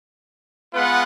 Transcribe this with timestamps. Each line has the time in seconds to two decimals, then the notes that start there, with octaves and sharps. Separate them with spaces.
0.74 G#3 B3 F4 B4 F#5